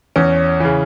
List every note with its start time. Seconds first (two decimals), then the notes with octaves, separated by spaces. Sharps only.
0.16 E2 C#4
0.60 C#3 E3